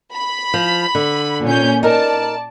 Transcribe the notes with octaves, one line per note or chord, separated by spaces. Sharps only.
B5
F3
D3
A#2 C#4 G6
D#4 A#4 D5 A5